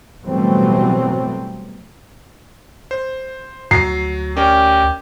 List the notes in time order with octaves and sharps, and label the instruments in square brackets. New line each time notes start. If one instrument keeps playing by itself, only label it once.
[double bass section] B2 E3 F#3 G3 A3 C4
[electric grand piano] C5
[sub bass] D2 [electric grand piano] F#3 A#5 [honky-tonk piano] C7
[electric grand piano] C#4 A#4 D5 [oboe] G4